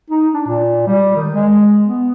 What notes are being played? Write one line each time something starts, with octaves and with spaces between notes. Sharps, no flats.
D#4
D4
A#2
G3
D#3
G#3
B3